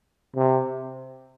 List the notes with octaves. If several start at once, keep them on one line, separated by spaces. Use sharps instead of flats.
C3